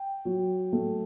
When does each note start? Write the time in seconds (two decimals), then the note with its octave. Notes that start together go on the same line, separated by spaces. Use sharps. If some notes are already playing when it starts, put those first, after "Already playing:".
Already playing: G5
0.25 F#3
0.73 A3